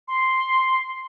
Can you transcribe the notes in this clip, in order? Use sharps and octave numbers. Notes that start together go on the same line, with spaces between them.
C6